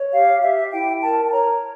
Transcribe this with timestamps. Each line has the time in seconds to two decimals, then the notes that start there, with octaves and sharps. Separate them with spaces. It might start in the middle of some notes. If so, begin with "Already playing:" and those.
Already playing: C#5
0.12 G4 F5
0.42 G4 E5
0.71 E4 G5
1.01 A#4 A5
1.25 A5
1.31 C#5 A#5